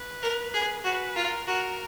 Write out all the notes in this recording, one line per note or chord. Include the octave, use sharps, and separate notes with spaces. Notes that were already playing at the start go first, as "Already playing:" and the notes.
Already playing: B4
A#4
G#4
F#4 B4
F4 A#4
F#4 A#4